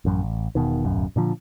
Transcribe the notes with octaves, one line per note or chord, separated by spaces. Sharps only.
A1 F#2
A1
E1 B2 D#3
D1 B1 F#2
A#2 D3 F3